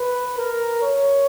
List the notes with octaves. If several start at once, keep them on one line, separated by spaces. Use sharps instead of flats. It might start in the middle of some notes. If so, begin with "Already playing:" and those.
Already playing: B4
A#4
C#5